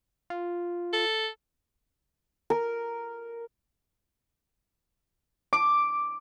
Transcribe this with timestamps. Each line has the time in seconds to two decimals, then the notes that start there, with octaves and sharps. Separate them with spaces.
0.30 F4
0.93 A4
2.50 A#4
5.53 D6